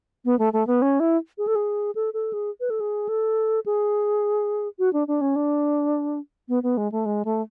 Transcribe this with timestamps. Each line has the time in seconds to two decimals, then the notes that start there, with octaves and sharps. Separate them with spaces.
0.25 B3
0.39 A3
0.53 A3
0.67 B3
0.82 C#4
1.00 E4
1.38 G#4
1.47 A4
1.55 G#4
1.95 A4
2.14 A4
2.33 G#4
2.60 B4
2.70 A4
2.80 G#4
3.09 A4
3.66 G#4
4.79 F#4
4.93 D4
5.08 D4
5.21 C#4
5.36 D4
6.49 B3
6.63 B3
6.77 G#3
6.92 A3
7.05 G#3
7.25 A3